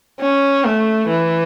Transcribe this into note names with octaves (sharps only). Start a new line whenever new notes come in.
C#4
A3
E3